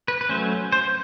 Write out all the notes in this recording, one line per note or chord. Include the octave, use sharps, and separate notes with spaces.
B4
B4
F#3 A3 C#4 C5
C5